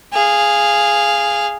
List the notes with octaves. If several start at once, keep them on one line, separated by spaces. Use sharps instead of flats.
G#4 F5